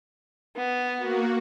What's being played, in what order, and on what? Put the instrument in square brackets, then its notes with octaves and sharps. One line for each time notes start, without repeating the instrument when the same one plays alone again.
[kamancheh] B3
[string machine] A#3 F#4